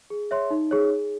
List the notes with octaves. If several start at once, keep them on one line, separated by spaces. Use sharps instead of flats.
G#4
C#5 E5 C6
D#4
G#4 C#5
G#4